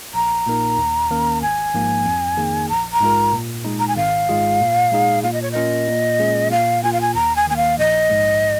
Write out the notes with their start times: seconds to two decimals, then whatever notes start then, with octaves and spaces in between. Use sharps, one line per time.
0.14 A#1 A#5
0.46 A#2 A#3 D#4 A#4
0.78 D#2
1.11 D#3 A#3 C#4 A#4
1.42 G#1 G#5
1.74 G#2 F3 A#3
2.05 F2
2.37 D#3 A#3 D#4 G#4
2.69 A#1 A#5
2.93 A#5
3.01 G#2 G#3 F4 A#4
3.33 A#2
3.65 G#3 D#4
3.79 A#5
3.88 G#5
3.96 G#1 F5
4.29 G#2 G#3 F4 G#4
4.61 A#2
4.92 G#3 D#4 G#4
5.23 A#2 F5
5.33 D#5
5.42 C#5
5.51 A#3 C#4 F4 A#4 D#5
5.88 A#2
6.19 G#3 C#4 G#4
6.50 A#2 F5
6.83 A#3 F4 G#5
6.93 F5
7.01 G#5
7.14 D#2 A#5
7.36 G#5
7.47 D#3 A#3 G#5
7.57 F5
7.78 A#1 D#5
8.10 G#2 G#3